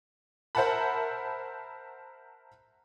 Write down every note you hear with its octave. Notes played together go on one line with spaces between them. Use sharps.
A#4 C5 E5 F#5 A5 B5